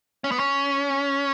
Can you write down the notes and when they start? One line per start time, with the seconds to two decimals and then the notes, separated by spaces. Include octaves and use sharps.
0.24 C#4
0.32 B3
0.39 C#4